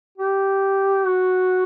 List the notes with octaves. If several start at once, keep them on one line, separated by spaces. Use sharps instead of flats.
G4
F#4